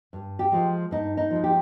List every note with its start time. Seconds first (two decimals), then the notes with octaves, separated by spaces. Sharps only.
0.13 G2
0.39 G4
0.52 F3 G#3
0.91 G2 D#4
1.17 D#4
1.30 F3 G#3
1.44 G4